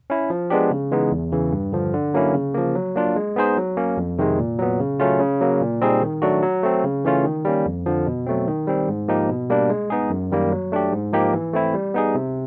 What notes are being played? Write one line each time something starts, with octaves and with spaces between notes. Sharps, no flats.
C#4 E4
F3
G#3 B3 D4 G4
C#3
E3 G#3 B3 D#4
E2
C#3 E3
G2
D3 F3
D3
F#3 A#3 C#4 E4
C#3
F3 A#3
F#3
A#3 D4 F4
G#3
B3 D#4 G#4 C5
F#3
A#3 C#4
F2
C3 D#3 G#3
A#2
F#3 B3
C#3
F#3 A3 C#4 F4
C#3
F#3 A#3
A#2
G3 C4 D#4 G#4
D#3
F#3 A3 D4 F#4
F#3
A3 C4
C#3
E3 A3 C#4 F4
D#3
G3 A#3 C#4
F2
D3 F3
B2
F#3 A3 C4
D#3
G3 C4
G#2
F3 A#3 D#4 G4
B2
G3 A#3 D4
G#3
B3 D#4 G#4
F#2
D#3 G3 A#3
F#3
A3 D4 G4
G#2
F3 A#3 D#4 G4
E3
A3 C4 E4
G3
B3 D#4 G#4
C3